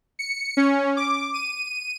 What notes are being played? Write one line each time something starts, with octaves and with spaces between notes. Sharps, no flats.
C#7
C#4
D6
D#7